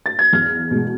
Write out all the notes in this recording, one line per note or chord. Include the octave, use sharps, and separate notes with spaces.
A6
G#6
E2 F6
B2 G#3